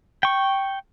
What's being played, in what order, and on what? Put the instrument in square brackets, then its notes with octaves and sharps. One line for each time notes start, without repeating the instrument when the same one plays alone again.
[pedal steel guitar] G5 C#6